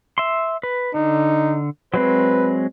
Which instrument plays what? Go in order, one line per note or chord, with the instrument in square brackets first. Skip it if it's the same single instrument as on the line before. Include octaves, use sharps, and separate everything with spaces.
[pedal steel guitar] E5 C6
B4
[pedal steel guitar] D3 [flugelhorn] D#4
[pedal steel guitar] F#3 G#3 C4 [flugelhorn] B4